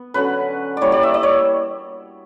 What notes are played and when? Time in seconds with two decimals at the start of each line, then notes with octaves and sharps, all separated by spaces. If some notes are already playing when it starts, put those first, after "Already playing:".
Already playing: B3
0.14 D3 F#3 C#4 B4
0.77 E3 G3 A#3 C#5 D5
0.92 D5
1.03 E5
1.14 D5
1.23 C#5